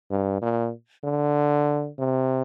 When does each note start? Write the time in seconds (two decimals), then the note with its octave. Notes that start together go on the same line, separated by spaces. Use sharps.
0.11 G2
0.42 A#2
1.04 D3
1.98 C3